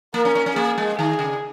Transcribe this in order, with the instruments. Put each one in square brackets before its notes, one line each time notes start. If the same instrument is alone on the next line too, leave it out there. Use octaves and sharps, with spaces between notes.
[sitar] A#3 [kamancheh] A#4
[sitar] C#4
C#4
C#4
[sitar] A#3 [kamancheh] G#4
[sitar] G#3
[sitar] D#3 [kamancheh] G#4
[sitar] C#3